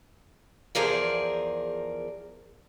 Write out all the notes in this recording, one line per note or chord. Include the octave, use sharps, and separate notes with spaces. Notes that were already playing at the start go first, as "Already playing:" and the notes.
E2 F3 G#4 A#4 D5